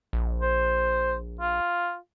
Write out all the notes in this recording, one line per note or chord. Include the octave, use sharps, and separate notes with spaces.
A#1
C5
F4